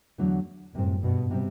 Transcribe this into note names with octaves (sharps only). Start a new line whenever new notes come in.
E2 D3 F#3 A3
F#2 A2 C3 G3 C4
G2 B2
C3 G3 C4